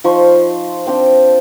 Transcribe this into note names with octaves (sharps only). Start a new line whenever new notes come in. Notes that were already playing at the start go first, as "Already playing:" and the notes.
F3 D#4 C6 C#6
C4 D4 G5